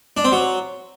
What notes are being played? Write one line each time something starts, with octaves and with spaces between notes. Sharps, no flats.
D4
C4
F#3